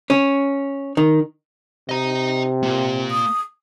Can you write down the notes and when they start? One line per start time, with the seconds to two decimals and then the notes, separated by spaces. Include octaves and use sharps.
0.10 C#4
0.97 D#3
1.89 C3 D#5 A#5
2.63 A#3 F4
3.11 D#6